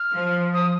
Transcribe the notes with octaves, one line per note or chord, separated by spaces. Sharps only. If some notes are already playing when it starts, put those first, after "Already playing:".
Already playing: F6
F3
D#6